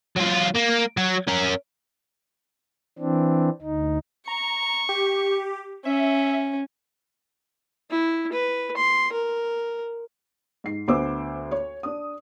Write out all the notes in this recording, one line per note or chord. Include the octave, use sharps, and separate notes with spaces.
F#3 F4
A#3
F#3
C#4 A#4
E3 C4 D4
D2 D#4
A#5 C#6
G4
C#4 E5
E4
B4
C6
A#4
G#2 C7
D2 B3 C5 D6 E6
C#5
D4 D#6